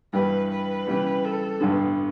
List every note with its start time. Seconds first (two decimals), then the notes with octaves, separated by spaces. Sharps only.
0.13 G2 E3 G3 B4
0.50 B4
0.87 C#3 E3 G3
1.24 A4
1.60 A1 G2 D3 B3